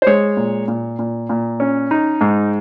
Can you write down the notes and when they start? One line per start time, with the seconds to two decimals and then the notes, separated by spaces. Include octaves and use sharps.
0.02 C5
0.06 G#3 C#5
0.37 A#2
0.68 A#2
0.99 A#2
1.29 A#2
1.60 C#4
1.91 D#4
2.21 G#2